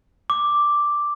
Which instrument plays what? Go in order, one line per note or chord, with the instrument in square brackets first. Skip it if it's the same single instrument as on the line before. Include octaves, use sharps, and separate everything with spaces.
[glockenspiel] D6